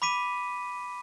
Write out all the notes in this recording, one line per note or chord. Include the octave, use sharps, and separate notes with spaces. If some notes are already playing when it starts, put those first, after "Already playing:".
B5 D6 B6 D#7